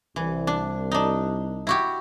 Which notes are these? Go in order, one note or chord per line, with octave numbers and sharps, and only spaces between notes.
C2 E3
D4
D4 D#4
E4 F#4 G4